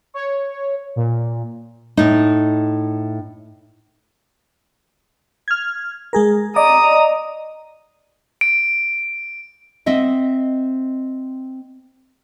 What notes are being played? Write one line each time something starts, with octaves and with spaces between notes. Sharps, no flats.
C#5
A#2
A2 D#4
F6 G#6
G#3 G#4 A#4
D5 D#5 A#5 D#6
D7
C4 D#5 E5 F#5